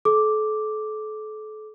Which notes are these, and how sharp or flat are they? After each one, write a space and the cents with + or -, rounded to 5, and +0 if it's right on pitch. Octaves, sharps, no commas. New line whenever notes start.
A4 -35 D6 +0